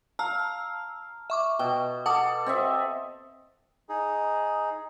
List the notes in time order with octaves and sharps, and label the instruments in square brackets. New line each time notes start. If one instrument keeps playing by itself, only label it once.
[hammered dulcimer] F5 [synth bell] A5 A#5 E6
[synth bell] E5 C#6 D6
[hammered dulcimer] B2 [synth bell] G5
[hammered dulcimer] A4 [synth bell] F#5 D6 D#6
[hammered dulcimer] C4 D#5 E5
[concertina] D#4 G#4